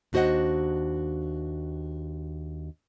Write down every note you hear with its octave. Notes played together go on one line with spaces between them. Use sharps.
D#2 D4 F#4 C5 D#5 F#5